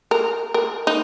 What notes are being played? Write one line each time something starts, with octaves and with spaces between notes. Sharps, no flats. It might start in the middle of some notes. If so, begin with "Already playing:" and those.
A#4
A#4
D#4